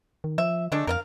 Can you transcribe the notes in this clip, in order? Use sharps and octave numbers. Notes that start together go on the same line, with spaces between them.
D#3
F3 E5
D3 G#3 A3 D4
F2 A#4 D#5 F5